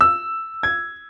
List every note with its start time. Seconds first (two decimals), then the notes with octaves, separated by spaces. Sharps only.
0.01 E6
0.63 G#6